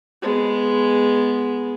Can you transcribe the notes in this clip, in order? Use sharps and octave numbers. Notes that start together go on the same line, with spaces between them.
G#3 B3